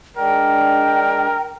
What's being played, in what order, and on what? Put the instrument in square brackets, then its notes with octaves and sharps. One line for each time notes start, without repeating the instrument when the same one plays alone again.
[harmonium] G#3 D4 [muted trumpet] A#4 [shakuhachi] G5